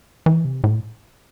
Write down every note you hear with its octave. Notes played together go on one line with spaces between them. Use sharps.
E3
C3
A2